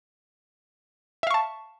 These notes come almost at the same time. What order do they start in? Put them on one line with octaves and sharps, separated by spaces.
E5 F5 C#6 A5